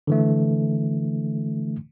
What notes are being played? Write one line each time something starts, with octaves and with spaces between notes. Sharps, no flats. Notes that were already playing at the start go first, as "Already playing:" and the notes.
D3 E3 A3